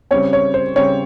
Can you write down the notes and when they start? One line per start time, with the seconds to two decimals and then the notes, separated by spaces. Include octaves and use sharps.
0.11 C#3 G3 C4 C#5
0.33 C#5
0.54 C5
0.76 C#3 G3 C4 C#5